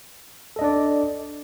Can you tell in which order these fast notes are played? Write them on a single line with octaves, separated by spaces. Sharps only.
A4 D#5 D4 D5